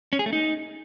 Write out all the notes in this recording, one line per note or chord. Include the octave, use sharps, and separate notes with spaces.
C#4
G#4
A3
D#4